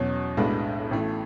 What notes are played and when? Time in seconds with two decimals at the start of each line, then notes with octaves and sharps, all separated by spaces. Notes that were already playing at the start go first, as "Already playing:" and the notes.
Already playing: E2 B2 F#3 C#4
0.37 B1 A2 G#3 B3 D4
0.91 A1 A2 E3 A3